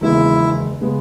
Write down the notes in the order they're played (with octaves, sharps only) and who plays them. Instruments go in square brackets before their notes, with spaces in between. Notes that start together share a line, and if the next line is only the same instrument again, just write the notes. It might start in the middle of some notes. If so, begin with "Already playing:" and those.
[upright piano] E1 D#2 C#3 G#3 B3 [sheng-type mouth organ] E4
[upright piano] C#3 G#3 B3